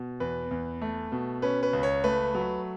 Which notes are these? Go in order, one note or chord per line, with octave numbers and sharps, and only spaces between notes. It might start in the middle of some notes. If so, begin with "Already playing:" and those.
Already playing: B2
E2 B4
E2
A3
B2
C#4 B4
B4
C#2
C#5
A3 B4
F#3